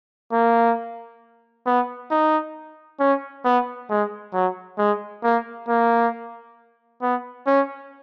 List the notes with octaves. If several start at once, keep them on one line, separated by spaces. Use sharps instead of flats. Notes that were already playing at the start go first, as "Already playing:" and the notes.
A#3
B3
D#4
C#4
B3
G#3
F#3
G#3
A#3
A#3
B3
C#4